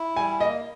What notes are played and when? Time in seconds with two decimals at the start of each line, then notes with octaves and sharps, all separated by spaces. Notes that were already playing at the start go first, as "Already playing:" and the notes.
Already playing: E4
0.16 G3 G#5
0.40 A#3 D#5